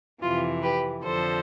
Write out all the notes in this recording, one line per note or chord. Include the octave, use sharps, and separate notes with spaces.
F2 C3 E3 F4
G4 B4
F2 D3 F3 A4 C5